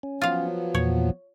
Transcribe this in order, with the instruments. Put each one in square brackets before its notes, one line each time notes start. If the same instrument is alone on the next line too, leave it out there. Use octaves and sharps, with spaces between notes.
[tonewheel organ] C#4
[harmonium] F3 F#3 B3 [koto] F4 F5
[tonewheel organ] E2 A#2 [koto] C#5